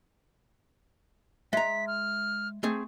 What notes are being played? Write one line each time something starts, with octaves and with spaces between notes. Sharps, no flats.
G#3 E5 A#5 B6
F6
A3 C4 G#4